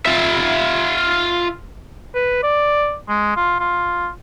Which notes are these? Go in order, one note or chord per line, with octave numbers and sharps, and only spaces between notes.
F4 E5
B4
D5
G#3
F4
F4